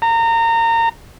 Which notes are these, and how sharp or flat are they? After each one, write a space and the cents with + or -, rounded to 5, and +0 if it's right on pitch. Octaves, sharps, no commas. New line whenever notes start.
A#5 -25